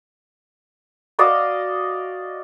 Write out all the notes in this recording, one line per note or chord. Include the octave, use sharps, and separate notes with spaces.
F#4 D5 D#5 F5